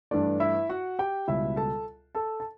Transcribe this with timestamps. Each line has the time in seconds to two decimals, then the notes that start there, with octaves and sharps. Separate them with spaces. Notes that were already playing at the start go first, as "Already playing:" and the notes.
0.11 G2 E3 A3 D4 D5
0.40 E4 E5
0.69 F#4 F#5
0.99 G4 G5
1.28 C#2 B2 G3 E4 E5
1.56 A4 A5
2.15 A4 A5
2.40 A5